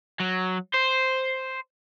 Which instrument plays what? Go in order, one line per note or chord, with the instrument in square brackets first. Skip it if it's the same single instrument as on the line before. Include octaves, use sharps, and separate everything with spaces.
[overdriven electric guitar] F#3
C5